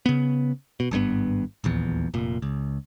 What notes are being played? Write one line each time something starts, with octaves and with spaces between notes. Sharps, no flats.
C#3 B3
B2
G#1 G2 C3 B3
D#1 A#1 E2
F1 A#2
C#2